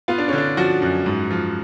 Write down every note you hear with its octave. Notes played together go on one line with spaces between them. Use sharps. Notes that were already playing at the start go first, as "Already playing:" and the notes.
B3 F4
D4
D3 C#4
D4
F3 F#4
F#2
G#2
F3